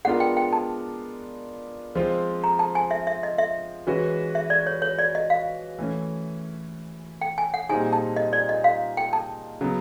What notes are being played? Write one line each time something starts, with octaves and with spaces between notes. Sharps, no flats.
G#3 B3 D4 F4 A#4 F#5
G5
G5
A5
F3 G#3 C4 F4
A#5
A5
G#5
E5
E5
D#5
E5
E3 G#3 C#4 F#4 B4
E5
D5
C#5
C#5
D5
D#5
F5
E3 A3 C#4
G5
G#5
F#5
A#2 G3 C4 D#4 G#4 G#5
A5
D#5
D5
D#5
F5
G5
A5
C#3 F#3 B3